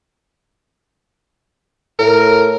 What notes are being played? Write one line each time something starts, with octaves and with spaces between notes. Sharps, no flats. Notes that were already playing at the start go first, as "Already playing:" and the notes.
A2 A#4